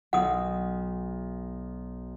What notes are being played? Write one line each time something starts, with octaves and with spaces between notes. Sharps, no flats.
B1 F#5 D#6